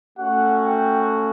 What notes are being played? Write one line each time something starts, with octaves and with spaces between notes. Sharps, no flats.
A3 C#4 F#4 F#5
G5